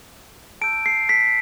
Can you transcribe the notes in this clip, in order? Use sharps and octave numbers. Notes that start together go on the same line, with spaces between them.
A5 E6 G6 D7
C7
B6